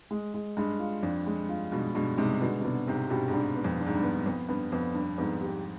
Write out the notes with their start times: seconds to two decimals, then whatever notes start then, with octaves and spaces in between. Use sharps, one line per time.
0.11 G#3
0.34 G#3
0.57 G2 G#3
0.79 F4
1.03 F2 D4
1.26 G#3
1.49 G2 F4
1.72 G2 B2 G#3
1.94 G2 B2 G#3
2.18 G#2 C3 G#3
2.41 B2 D3 B3
2.60 C3
2.64 B2 D3 B3
2.87 G#2 C3 G4
3.10 G2 B2 G4
3.28 G#2
3.33 G2 D4
3.56 B3
3.64 F2
3.80 D4
3.86 G#2
3.95 G2
4.03 B3
4.26 F2 B3
4.49 G2 B3
4.72 F2 B3
4.94 G2 D4
5.18 F2 G#2 B3
5.42 G4